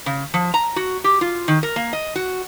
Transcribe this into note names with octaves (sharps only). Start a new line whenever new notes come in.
C#3
F3
A#5
F#4
G4
F4
D#3
A#4
A#3
D#5
F#4